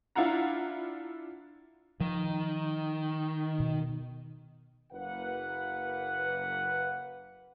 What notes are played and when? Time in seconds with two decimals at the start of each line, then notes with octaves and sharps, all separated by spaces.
0.15 D4 E4 F4 F#5 A#5
2.01 D#3 F3
3.60 B2
4.92 F#1 A#3 B4 F#5